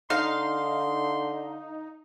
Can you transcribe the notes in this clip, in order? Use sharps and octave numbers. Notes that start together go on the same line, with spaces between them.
D3 D#4 F5 C6